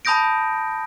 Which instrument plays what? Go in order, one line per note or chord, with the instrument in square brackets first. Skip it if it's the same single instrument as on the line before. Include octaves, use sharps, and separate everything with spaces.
[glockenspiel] A5 B5 D#6 G6 A#6 D7